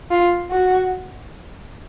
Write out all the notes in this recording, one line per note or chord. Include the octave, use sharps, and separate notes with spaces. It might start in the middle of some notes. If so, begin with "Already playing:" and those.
F4
F#4